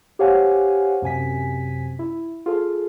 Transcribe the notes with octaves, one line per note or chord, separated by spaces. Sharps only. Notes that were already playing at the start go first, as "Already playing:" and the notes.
G4 C5 C#5 F5 F#5 G#5
F#2 C3 G#5 B6
E4
F4 G#4 A4